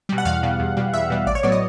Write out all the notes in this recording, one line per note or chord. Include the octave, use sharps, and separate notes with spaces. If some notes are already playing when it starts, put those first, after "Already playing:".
B2 G3
F#5
E2 F5
B2 G3
E2
B2 G3
E2 E5
B2 G3
A1 D5
C#5
A2 F#3 B3 D5
D#5